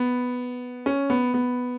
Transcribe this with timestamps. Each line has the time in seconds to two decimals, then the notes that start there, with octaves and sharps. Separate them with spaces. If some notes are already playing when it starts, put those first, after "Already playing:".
Already playing: B3
0.86 C#4
1.10 B3
1.34 B3